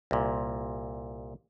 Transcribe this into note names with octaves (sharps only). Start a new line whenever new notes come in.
C2 A#2